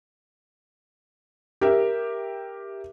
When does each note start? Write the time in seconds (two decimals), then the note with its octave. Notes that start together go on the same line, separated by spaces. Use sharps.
1.61 G4 A#4 E5